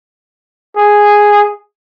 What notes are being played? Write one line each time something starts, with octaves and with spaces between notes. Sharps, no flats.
G#4